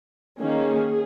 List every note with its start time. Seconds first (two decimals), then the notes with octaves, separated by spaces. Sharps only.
0.41 D#3 A#3 C#4 G#4